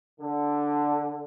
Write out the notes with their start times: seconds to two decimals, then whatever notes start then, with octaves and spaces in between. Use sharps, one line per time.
0.19 D3